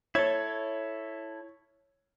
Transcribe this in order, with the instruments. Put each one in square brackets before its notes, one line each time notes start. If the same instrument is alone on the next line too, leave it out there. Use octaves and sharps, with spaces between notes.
[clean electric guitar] E4 A4 [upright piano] C#5 G#6